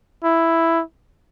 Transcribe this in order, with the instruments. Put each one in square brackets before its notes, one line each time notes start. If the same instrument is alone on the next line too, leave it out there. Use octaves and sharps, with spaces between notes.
[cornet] E4